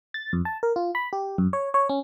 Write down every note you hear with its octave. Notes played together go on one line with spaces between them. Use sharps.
A6
F2
A5
A#4
F4
B5
G4
F#2
C#5
C#5
C#4